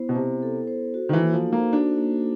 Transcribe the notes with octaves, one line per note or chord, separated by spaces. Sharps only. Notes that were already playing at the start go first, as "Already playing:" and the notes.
Already playing: B3 E4 C5
B2
C3 C5
A4
C5
F#4
D#3
E3
A#3
F3
D#4
A#3
D4 F#4
A#3